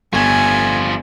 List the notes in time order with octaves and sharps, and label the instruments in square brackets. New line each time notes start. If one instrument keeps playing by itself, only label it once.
[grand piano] G1 C#6 G#6 [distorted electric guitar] F3 A3 [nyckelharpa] G#5